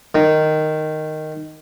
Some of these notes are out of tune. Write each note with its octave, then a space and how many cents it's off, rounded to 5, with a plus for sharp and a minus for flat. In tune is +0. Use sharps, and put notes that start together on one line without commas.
D#3 -5